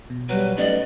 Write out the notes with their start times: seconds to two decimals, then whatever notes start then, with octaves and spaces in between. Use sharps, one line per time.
0.10 B2
0.29 F#3 G3 B4
0.57 B2 A3 C#4 D#4 D5 D#5